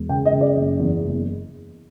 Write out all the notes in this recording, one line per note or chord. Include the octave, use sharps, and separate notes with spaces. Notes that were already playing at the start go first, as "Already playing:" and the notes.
Already playing: E1
C#3 G5
D#5
C#3
D5
F#1 D#5
E2
F#1